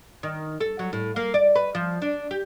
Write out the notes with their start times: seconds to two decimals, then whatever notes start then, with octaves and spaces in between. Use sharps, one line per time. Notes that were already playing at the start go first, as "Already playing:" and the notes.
0.23 D#3
0.61 A4
0.79 F#3
0.93 A2
1.16 A#3
1.34 D5
1.56 B4
1.75 F3
2.02 D4
2.31 G4